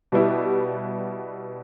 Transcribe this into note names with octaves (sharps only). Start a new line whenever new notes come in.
B2 G3 B3 E4 G4